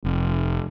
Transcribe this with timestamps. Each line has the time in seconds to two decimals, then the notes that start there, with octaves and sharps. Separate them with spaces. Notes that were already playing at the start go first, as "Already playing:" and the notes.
0.04 F1